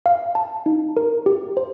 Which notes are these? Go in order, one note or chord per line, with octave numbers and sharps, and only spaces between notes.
F5
A5
D#4
A#4
G4
C5